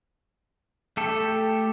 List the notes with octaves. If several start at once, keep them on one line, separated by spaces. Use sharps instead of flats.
A3 G4 A4